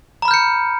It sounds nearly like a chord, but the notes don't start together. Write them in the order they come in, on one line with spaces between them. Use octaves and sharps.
A#5 B5 F6 G6 C#7